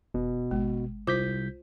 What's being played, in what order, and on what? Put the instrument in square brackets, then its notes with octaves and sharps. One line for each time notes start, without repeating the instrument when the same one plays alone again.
[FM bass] F1 [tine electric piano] B2
[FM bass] G#1 [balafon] G#3
[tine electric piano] C2 G6 B6 [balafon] F4 C5 D6